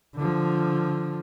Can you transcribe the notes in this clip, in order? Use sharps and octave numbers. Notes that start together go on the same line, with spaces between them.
D3 F3